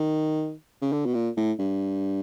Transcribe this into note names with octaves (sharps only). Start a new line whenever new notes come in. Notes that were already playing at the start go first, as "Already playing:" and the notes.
Already playing: D#3
C#3
D3
B2
A#2
A2
G2